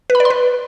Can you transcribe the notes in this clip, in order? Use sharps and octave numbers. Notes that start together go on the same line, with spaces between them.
B4
B5
D5
C6
B4